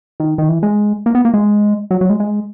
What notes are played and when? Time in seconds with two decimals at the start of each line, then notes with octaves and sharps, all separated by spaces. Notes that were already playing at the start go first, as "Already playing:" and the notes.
0.20 D#3
0.38 D#3
0.49 E3
0.63 G#3
1.06 A#3
1.15 B3
1.25 A#3
1.34 G#3
1.91 F#3
2.01 F#3
2.10 G#3
2.20 G#3